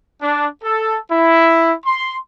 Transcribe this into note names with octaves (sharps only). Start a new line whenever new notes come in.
D4
A4
E4
C6